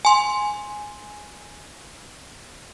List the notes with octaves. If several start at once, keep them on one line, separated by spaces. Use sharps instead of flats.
G#5 C6